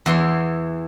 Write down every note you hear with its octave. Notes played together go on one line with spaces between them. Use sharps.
E2 E3 C6